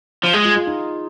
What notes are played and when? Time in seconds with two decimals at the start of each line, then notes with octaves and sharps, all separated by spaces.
0.23 F3
0.33 G#3 G#4
0.45 F4
0.56 F4
0.67 D#4